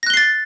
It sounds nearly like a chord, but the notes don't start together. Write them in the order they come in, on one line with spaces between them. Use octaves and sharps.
A#6 F#6 G7 C7 A6